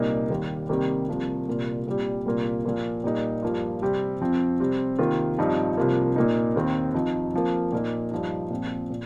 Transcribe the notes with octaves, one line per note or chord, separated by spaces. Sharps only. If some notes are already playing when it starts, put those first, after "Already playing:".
Already playing: C2 A#2 A#3 D#4
D#2 D#3 G3
C3 D#3 G3 A#3
C2 C3 F3 A#3
C2 A#2 A#3 F4
C2 A#2 G3
C2 A#2 A#3 F4
A#2 F3 A#3 F4
A#2 G3 A#3 D#4
G2 F3 A#3 F4
C3 G3 C4
F2 F3 C4
C3 G3 C4
C3 D#3 A#3 F4
G2 F3 C4 D#4
C2 C3 F3 A#3 F4
A#2 A#3 D#4
D#2 D#3 C4
F2 F3 D#4
F2 F3 A#3
A#2 A#3 D#4
G2 F3 D#4
A#2 F3 C4
A#2